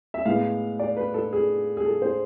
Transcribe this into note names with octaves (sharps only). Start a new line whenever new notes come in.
E5
A2 G#3 B3 F5
D5
B4
A4
G#4
G#4
A4
C5